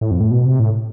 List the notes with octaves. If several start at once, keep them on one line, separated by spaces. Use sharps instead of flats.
A2
F2
A2
B2
C3
A2